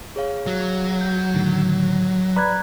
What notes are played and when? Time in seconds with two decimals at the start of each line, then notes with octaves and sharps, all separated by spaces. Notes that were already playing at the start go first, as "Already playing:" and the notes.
0.16 G#4 C#5 F5
0.46 F#3
1.01 G6
1.34 A2 D3 D#3
2.36 B4 D5 A#5 B5 F#6 G#6